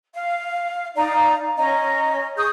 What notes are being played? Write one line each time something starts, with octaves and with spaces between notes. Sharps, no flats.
F5
D#4 D5 F5 A#5
C#4 D#5 A#5
G#4 C#6 D#6 G6